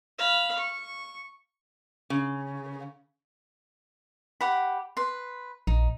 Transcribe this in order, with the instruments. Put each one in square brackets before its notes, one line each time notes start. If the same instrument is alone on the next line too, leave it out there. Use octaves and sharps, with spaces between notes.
[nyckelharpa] F5 B5
C#6
[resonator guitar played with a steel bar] C#3
[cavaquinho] G4 F#5 B5
B4 C6
[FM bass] A#1 [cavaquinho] D#4